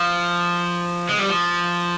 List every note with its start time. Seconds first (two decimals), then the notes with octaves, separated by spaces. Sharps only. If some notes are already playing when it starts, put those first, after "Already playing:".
Already playing: F3
1.09 G#3
1.19 G3
1.29 F3